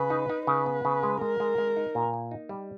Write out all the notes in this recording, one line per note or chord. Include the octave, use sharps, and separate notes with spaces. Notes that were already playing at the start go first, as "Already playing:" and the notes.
Already playing: C#3 B4
D#4
D#4
C#3 B4
B3
C#3
G#3
G#3 A#4
G#3
G#3
D#4
A#2
A#3
D#4
G3